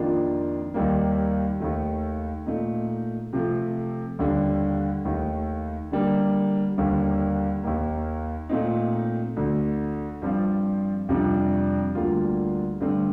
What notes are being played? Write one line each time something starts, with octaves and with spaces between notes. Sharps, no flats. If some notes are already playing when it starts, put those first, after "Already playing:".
Already playing: F2 D#3 A#3 D4 F4
D#2 D#3 G3 A#3
D#2 D#3 A3
A#2 A3 D#4
C3 F3 A3
D#2 D3 G3
D#2 D#3 A3
D3 G3 A#3
D#2 D3 G3 A#3
D#2 D#3 A#3
A#2 A3 C4 D#4
D2 D3 A3
G2 F3 C4 F4
F2 C3 G3 D4
D2 D3 G3 A#3 F4
G2 D3 A3 C4